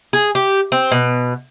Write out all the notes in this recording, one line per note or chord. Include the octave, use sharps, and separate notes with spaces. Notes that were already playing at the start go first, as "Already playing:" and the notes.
G#4
G4
C4
B2